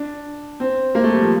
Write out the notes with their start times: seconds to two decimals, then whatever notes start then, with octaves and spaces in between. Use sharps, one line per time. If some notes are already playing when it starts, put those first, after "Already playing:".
Already playing: D4
0.60 C4
0.95 A#3
1.04 A3
1.13 G3
1.21 F3